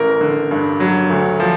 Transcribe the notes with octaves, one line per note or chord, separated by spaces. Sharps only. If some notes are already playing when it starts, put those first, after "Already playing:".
Already playing: A1 A#4
D3
G2
F#3
D2
F3